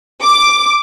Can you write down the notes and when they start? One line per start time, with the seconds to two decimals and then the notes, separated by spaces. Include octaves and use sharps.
0.23 D6